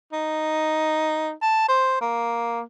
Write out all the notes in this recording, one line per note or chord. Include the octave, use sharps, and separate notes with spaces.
D#4
A5
C5
A#3